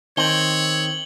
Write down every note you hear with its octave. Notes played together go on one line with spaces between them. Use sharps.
D#3 C4 C#5 F#7 G7